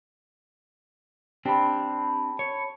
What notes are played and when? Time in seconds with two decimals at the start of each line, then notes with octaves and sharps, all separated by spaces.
1.45 C4 D4 G4 A5 B5
2.39 C#5